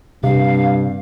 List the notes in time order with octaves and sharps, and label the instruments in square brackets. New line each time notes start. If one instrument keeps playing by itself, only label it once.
[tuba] G2 [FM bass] C3 [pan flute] F5